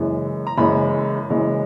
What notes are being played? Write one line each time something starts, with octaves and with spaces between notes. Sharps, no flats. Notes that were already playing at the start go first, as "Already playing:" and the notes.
Already playing: F#1 F#2 E3 G#3
A#5
F#1 F#2 E3 G#3 B5
F#1 F#2 E3 G#3